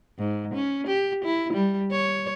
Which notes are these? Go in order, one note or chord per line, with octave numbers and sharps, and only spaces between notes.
G#2
C#4
G4
E4
G3
C#5